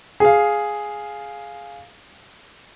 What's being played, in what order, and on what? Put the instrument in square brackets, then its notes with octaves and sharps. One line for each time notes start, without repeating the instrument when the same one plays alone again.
[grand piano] G#4 F5